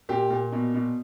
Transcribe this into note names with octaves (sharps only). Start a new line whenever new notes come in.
A#2 G4
A#2
B2
B2